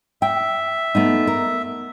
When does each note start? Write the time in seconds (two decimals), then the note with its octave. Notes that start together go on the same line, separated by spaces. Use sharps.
0.22 E5 G5
0.95 A3 B3 D#4
1.27 A#4